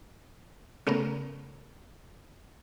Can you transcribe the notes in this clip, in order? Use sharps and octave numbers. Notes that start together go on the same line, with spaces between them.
C#3 A3 B3 C#4 A#4